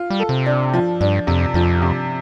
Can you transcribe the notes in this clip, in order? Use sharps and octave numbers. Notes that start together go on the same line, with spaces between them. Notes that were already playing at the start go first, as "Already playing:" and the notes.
Already playing: F4
G3
A4
C3
D4
F3
G2 D4
F2 C3
F2 F3
C3